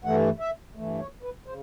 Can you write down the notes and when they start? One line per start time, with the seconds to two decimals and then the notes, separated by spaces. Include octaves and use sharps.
0.04 G2 E3 A3 F#5
0.40 E5
0.75 G2 E3 A3
1.00 C#5
1.23 B4
1.46 C#3 C5